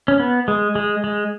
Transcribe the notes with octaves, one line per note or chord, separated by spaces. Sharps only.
C#4
B3
G#3
G#3
G#3